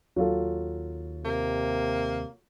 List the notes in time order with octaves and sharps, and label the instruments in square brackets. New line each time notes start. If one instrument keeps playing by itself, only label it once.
[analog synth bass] D#2 [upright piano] F#3 F4 A4
[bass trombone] C3 [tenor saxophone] A#3